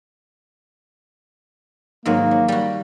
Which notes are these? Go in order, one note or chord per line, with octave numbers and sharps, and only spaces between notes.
G#2 D#3 F#3 A#3
F#3
G3 F#4